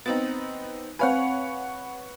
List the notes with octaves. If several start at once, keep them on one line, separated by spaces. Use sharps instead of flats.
B3 C4 D#4 A6
C4 B4 C#5 F5 F#5 G#5